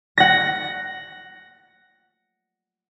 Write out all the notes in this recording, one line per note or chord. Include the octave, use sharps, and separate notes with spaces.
F#5 A#6